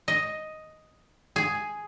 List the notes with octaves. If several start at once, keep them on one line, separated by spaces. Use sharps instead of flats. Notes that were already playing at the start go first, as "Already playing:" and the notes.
D#5
G#4